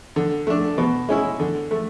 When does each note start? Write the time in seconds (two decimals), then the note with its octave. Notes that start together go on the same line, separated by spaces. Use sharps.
0.16 D3
0.47 A3 D4
0.78 B2
1.09 G#3 C#4 E4
1.40 D3
1.71 A3